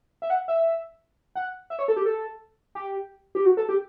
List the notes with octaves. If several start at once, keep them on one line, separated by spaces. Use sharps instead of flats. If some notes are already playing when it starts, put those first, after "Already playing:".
E5
F#5
E5
F#5
E5
C#5
A4
G4
A4
G4
G4
F#4
A4
G4